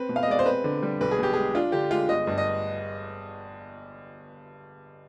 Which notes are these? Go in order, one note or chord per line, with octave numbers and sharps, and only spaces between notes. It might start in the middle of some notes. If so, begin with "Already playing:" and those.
Already playing: C4 B4
B2
F5
D#5
G#3 D5
C5
C4 B4
D3
G3
B1 B4
G#4
B2 G4
G#3 G#4
D4 F4
D3 G4
G#3 F4
G1 D#5
G2
D#5